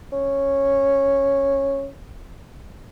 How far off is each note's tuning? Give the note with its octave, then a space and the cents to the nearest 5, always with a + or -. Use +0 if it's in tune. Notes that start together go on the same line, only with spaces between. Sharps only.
C#4 -10